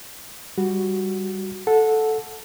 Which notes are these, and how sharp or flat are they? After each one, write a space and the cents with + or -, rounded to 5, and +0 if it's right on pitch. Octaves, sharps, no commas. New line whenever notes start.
G3 +0 F#4 +0
A4 -5 F#5 -20